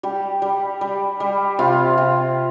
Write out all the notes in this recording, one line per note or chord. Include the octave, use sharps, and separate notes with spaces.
G3 G4
G3
G3
G3
C3 F4
C3